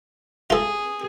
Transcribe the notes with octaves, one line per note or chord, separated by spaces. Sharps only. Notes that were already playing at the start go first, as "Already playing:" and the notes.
F4 G#4 A4